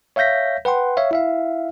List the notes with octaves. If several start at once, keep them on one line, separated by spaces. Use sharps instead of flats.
C#5 E5 F5 G6 A#6 B6
B4 F#5 G5 C6
C#5 E5 F5
E4 E5 F5